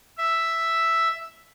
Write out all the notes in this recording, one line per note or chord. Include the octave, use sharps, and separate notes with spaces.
E5